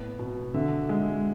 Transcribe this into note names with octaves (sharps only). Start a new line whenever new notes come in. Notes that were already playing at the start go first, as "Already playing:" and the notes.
Already playing: A2 B3
B2
D3 E5
G#3